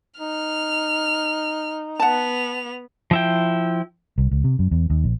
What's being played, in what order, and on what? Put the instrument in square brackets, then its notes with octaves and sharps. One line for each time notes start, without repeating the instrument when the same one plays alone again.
[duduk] D#4 [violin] F6
[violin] B3 F7 [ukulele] F#5 A5
[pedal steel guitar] F3 E4 G5
[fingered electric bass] C2
C#2
C3
F#2
E2
D#2
A#1